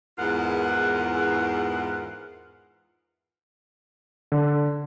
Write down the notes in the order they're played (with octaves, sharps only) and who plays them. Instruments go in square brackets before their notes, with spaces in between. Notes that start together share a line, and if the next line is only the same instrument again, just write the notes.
[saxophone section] E2 G#2 E3 F4 A#4 F#5
[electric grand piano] D3